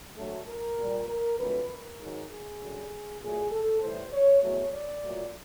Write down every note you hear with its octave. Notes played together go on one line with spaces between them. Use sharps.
D2 D3 F#3 A3 A4
A#4
A#2 G3
A#4
F2 D3 F#3 A3 B4
A#4
G#2 D#3 F#3
G#4
F#2 D3 G3
A#2 F#3 A3 G#4
A4
A2 E3 G3 C5
C#5
E2 B2 F#3 A3 C#5
D5
A#2 F#3 A3